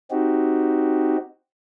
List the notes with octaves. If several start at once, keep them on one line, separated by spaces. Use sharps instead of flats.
C4 D#4 F#4 G4